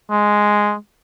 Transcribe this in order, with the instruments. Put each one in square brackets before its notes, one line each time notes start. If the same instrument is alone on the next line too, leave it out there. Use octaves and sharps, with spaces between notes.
[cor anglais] G#3